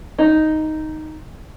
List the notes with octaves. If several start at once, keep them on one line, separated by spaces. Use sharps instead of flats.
D#4